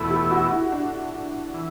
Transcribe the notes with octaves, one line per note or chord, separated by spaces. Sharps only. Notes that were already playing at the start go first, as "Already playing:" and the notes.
Already playing: E2 B2 A3 E4 A4
G4
F#4
E4
D4
E3